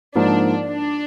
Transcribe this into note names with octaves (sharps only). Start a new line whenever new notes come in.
G#2 F3 A#3 D4 D#4
D4